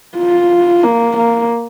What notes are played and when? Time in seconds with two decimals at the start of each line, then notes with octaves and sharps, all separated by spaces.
0.18 F4
0.83 A#3
1.17 A#3